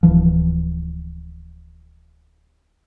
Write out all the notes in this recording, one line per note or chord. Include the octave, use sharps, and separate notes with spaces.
D1 C2 E3 F3